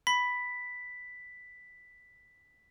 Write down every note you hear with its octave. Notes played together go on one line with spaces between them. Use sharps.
B5 B6